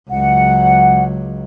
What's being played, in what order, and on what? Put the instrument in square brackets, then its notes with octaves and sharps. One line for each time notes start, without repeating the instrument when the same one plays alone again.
[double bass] C#2 F#3 [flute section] F#5